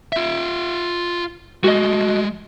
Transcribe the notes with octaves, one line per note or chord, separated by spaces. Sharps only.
F4 E5
G#3 A3 F#4 D#5